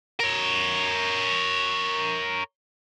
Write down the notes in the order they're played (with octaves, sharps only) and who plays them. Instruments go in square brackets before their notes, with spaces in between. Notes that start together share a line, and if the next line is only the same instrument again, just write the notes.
[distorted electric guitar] A#4 C#5